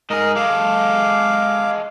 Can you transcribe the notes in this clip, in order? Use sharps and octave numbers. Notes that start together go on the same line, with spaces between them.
G#2 G#4 A#4 D#5
G#3 A4 F5 D6